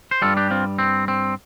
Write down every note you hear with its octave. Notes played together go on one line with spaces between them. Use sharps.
C5
G2 G3 F4 A4
D4 G4
C4 F4
C4
C4